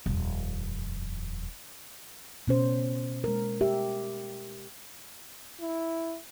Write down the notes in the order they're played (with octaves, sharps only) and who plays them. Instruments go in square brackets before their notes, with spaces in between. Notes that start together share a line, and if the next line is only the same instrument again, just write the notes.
[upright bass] D#1 F2
[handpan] B2 C#4 C5
G#3 A#4
G4 E5
[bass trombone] E4